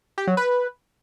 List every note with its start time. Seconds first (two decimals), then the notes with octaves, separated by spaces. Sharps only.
0.18 G4
0.27 F#3
0.37 B4